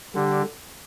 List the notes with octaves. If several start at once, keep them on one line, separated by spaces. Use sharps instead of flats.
D3 G3 D4 G4